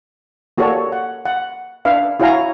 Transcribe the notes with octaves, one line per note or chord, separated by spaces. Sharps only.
A#3 F#4 G4 A4 C#5 D5
F#5
F#5
D4 B4 E5 F5
E4 F#4 C#5 F5 G#5 A#5